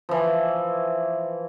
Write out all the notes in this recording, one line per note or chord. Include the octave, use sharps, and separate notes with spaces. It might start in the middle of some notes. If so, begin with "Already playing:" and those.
E3 F3